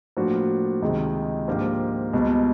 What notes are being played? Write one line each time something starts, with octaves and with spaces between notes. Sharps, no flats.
A2 F3 A#3 D4 F#4
C#2 C3 D#3 G#3
G#2 F3 A#3 D4 G4
C#2 B2 G3